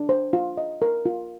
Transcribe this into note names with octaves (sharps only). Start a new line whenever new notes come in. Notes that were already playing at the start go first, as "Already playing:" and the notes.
Already playing: D4
C5
F4
D#5
A#4
F4